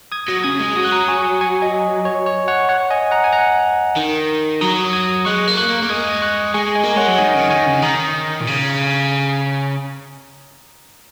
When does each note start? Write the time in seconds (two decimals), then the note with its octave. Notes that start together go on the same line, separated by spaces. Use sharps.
0.12 D#6 G#6
0.28 F#3
0.44 C#3 D#6 G#6
0.60 G#3
0.76 F#3 D#6
0.84 F#6
0.91 A#5 D#6
1.08 G#5 C#6
1.41 G#5 C#6
1.62 D#5 G#5
2.05 C#5
2.26 C#5
2.48 C#5 F#5
2.69 C#5 F#5
2.90 D#5 G#5
3.11 F#5 A#5
3.24 G#5
3.32 F#5 A#5
3.97 D#3
4.61 F#3 A#5 D#6
4.93 D#6 G#6
5.25 G#3 C#6 F#6
5.48 A#3
5.57 C#6 F#6
5.68 A#3
5.83 A#3
5.89 G#3 D#6 G#6
6.13 G#6
6.22 C#6 F#6
6.54 G#3 G#5 C#6
6.75 D#5 G#5
6.83 A#3
6.96 G#3 C#5 F#5
7.07 F#3
7.18 D#3 D#5 G#5
7.34 C#3
7.50 D#3 G#5 C#6
7.66 C#3
7.82 D#3 A#5 D#6
8.40 A#2
8.47 C#3